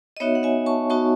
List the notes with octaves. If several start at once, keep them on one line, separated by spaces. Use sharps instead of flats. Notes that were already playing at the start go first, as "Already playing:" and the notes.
D#5
B3 D#4 F#4 C#5 E5
F#5
E5 G#5
A5 C#6
B3 D#4 F#4 A5 C#6